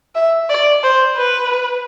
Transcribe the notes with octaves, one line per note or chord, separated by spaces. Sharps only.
E5
D5
C5
B4